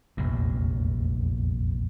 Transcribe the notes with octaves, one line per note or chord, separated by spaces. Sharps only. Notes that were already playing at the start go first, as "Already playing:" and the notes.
F1 A#1 E2 G2